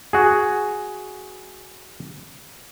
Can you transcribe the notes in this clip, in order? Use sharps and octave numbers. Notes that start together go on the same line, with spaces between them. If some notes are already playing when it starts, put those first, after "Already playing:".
F#4 G#4